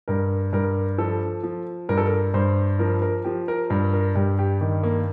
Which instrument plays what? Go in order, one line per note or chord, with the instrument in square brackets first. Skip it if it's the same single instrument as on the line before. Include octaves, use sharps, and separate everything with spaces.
[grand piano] G2 A#4
G2 A#4
F3 A4
F3
G2 A#4
A4
A#4
G2 C5
F3 A#4
A#4
F3 G4
A#4
G2 A#4
A#4
G2 G4
G4
D#3
A#3